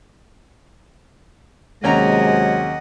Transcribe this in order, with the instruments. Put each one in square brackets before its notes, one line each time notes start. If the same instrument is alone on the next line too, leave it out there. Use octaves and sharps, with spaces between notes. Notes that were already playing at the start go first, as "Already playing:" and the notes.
[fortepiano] D#2 C#4 A#5 [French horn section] C3 F#3 G#3 [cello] D#5 F#5